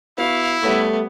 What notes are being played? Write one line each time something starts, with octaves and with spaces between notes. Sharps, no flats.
B3 E4 F#4 E5 F5
G3 A3 B3 C#5